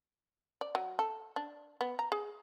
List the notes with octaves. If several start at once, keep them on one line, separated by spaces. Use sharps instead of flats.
D5
F#3
A4
D4
B3
A#5
G#4